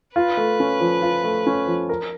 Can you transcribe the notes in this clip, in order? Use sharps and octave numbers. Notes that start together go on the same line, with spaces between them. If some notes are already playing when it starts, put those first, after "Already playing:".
F4 B4
A3
C#4
F3
F4
A3
C#4
F3
A#4